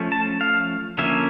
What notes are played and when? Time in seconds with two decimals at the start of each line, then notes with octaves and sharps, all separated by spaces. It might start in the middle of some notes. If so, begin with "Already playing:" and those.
Already playing: F3 A3 C#4
0.12 A5
0.41 F5
0.98 D3 F3 A#3 C#4 E5